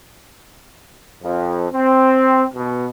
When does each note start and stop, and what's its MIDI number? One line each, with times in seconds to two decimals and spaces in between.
1.22 1.65 41
1.71 2.44 60
2.53 2.86 47